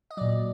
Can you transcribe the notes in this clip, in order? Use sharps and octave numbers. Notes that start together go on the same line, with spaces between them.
D#5
A#2 F#3 D5